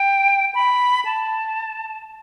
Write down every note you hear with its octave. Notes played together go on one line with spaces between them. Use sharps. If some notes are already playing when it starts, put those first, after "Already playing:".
Already playing: G5
B5
A5